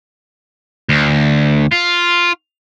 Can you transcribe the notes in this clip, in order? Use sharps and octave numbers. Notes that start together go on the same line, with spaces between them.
D2
F4